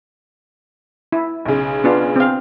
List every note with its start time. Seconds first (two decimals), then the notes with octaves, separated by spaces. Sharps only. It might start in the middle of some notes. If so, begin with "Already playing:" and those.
1.12 E4
1.46 B1 C#3
1.84 B3 D4 F4
2.16 C4 F5